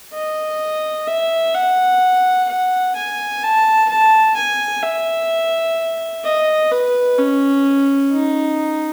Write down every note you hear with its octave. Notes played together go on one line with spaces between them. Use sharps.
D#5
E5
F#5
F#5
G#5
A5
A5
G#5
E5
D#5
B4
C#4
D#4